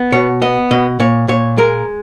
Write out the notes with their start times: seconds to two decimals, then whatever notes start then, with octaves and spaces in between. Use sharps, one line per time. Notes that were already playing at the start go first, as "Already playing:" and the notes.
Already playing: B3
0.12 B2 C#5
0.42 B3 D#5
0.71 B2 D#5
1.00 A#2 C#5
1.28 A#2 C#5
1.58 G#3 A#4